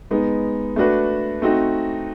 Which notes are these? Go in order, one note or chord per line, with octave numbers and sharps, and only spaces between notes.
G#3 B3 D#4
A3 D4 F#4 B4
A3 C4 D#4 F#4